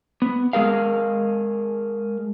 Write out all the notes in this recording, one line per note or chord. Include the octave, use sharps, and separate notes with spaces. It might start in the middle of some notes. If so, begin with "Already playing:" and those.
B3
G#3 G#4 A#4 F5